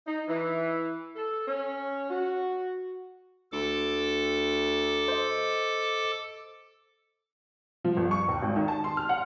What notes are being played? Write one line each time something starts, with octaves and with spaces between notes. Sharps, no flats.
D#4
E3
A4
C#4
F#4
D2 A4 D6
C5 D#5
F3
G1
C#6
D#2
G#1
D#3
A5
C6
F6
F#5